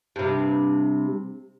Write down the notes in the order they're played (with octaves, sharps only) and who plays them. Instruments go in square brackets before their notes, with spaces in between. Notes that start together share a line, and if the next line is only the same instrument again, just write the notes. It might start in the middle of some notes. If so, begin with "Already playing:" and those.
[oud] G2 C3